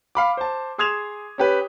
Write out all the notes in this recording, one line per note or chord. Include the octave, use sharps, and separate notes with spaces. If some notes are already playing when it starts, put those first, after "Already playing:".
F5 B5 D6
C5 A5
G#4 C6 D#6 G#6 E7 F7
C#4 G4 B4